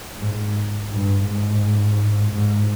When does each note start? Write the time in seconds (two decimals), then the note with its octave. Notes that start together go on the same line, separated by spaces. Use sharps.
0.18 G#2
0.89 G2
1.23 G#2
2.29 G#2